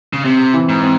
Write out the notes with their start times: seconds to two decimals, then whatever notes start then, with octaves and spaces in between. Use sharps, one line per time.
0.13 C#3
0.25 C3 C4
0.54 E3
0.69 G#2
0.83 C4